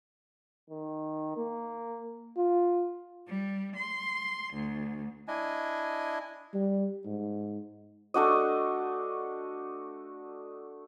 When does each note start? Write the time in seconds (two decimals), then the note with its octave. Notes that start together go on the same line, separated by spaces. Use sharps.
0.70 D#3
1.37 A#3
2.37 F4
3.27 G3
3.76 C6
4.54 D2
5.28 D4 E4 D#5 G#5
6.54 G3
7.06 G#2
8.14 A3 D4 F#4 D#5